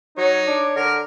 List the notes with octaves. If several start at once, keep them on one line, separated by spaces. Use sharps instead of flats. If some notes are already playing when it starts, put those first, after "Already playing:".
F#3 D#4 C#5
D4 D6
D3 A#4 D6